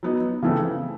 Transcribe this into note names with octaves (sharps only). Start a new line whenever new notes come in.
F#3 B3 D#4
C#3 E3 A3 C4